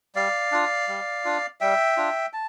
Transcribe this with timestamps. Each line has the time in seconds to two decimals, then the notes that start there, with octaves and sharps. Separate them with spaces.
0.15 G3 D5 F5
0.52 D4 F4
0.88 G3
1.25 D4 F4
1.61 G3 E5 G5
1.97 D4 F4
2.33 A5